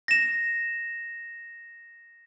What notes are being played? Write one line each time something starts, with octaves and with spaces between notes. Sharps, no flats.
A#6 E7